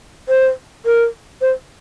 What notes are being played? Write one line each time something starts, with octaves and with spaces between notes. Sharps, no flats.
C5
A#4
C5